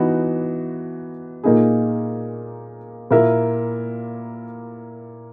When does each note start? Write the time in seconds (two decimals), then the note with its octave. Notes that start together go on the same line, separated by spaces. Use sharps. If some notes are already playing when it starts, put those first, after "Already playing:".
Already playing: E3 B3 D#4 F#4
1.44 A#2 A#3 D#4 G#4
3.11 A#2 A#3 E4 A#4 E5